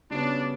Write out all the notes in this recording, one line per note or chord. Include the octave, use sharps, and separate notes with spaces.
C#3 G3 B3 D4 F#4 C#5